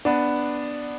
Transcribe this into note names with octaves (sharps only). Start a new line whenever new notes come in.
B3 D4